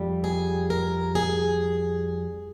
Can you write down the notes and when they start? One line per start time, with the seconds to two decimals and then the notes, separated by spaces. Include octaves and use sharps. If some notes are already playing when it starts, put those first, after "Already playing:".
Already playing: F2 G3
0.24 G#4
0.70 A#4
1.15 G#4